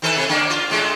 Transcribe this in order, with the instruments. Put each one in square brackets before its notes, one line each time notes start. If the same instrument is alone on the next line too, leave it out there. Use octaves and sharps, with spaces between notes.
[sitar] D#3 A4 B4
C3
D3 A#3 D4
F4
A2 G#3 A3